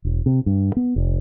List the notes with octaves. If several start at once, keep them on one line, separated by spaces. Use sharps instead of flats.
E1
C3
G2
B3
F1